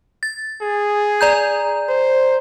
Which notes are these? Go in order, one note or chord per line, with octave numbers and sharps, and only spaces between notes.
A6
G#4
D5 A#5 G6
C5